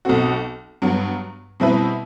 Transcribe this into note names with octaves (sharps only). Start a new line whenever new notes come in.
B1 B2 A3 C4 F#4
G2 F#3 B3
B2 G3 C4 E4 B4